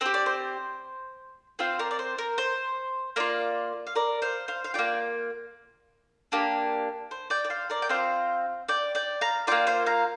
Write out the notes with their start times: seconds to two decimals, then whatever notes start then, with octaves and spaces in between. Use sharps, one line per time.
0.01 C4 G4 C5
0.14 D5
0.26 C5
1.59 C4 F4 C5 F5
1.79 A#4 D5
1.91 D5
1.99 C5
2.19 A#4
2.38 C5
3.16 A#3 F4 A#4 D5
3.87 F5
3.95 A#4 D5
4.22 C5 F5
4.48 C5 F5
4.64 F5
4.74 A#3 F4 D5 G5
6.32 A#3 D4 G4
7.11 C5
7.30 D5 G5
7.45 D5
7.50 C5 F5
7.70 A#4 D5
7.82 G5
7.89 C4 F4 C5 F5
8.68 D5 G5
8.95 D5 G5
9.21 F5 A#5
9.47 A#3 F4 D5 G5
9.67 C5 F5
9.86 F5 A#5